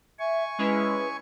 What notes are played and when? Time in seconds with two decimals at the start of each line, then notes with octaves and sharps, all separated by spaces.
0.19 E5 G#5 C#6
0.59 G#3 C#4 E4 B4